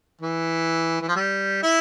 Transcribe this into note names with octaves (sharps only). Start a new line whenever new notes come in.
E3
E3
F3
G3
E4